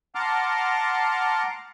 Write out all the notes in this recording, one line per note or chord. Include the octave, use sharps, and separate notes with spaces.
F#5 A5 A#5 C6 D6 F6